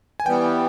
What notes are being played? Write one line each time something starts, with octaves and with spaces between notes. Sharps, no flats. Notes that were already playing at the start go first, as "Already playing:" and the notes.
G#5
E3 G3 B3 G5